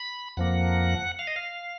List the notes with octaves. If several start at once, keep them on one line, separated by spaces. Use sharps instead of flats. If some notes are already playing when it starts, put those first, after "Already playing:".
Already playing: B5
F2 F3 A#3 F#5
F5
D#5
F5